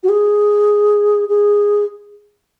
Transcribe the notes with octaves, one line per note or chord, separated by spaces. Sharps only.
F#4
G#4
G#4